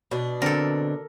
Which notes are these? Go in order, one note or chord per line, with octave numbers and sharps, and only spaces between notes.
B2 D4
D3 C4 A4 A#4